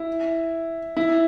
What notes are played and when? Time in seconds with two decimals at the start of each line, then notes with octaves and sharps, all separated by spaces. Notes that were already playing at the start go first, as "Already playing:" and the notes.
Already playing: E4
0.97 E4